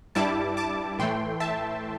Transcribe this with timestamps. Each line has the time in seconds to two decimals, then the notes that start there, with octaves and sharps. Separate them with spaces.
0.15 G2 G3 E4 A5 D6
0.57 A5 D6
0.99 A2 E3 A3 G5 C6
1.40 E5 A5